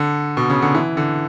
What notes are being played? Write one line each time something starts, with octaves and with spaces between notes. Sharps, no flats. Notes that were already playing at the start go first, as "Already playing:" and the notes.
Already playing: D3
B2
C#3
D3
E3
D3